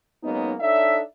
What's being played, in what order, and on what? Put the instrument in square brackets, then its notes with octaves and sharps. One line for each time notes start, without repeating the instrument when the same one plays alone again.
[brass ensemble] F#3 G#3 A#3 B3 C#4 D#4
D4 D#4 A4 C#5 D5 E5